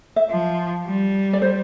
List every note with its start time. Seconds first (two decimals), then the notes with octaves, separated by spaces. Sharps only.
0.16 E5
0.30 F3
0.87 G3
1.33 D5
1.42 C5